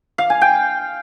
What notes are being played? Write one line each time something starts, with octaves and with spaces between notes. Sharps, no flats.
F5
G#5
G5